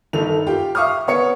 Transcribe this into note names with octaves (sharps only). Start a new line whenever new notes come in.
G1 D#3 A4 F7
F4 G4 G5
E5 F5 C#6 D#6 F6
B3 C#5 C#7